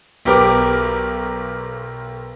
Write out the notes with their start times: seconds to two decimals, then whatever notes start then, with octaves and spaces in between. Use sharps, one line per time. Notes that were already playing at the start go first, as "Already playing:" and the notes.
0.25 B1 G4 A#4 B4 D6